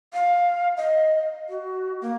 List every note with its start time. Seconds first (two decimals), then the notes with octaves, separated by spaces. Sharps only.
0.13 F5
0.77 D#5
1.49 F#4
2.01 A#3